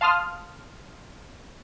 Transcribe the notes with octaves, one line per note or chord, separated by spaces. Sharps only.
F5 A5 C6 D#6 F6